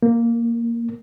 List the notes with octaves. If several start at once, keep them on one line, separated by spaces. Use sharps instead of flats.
A#3